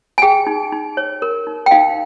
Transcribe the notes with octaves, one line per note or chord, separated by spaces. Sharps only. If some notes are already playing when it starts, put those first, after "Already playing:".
G#5
G#4 G5
D#4
D#4
C#5
A#4
D#4
G5
D#4 F5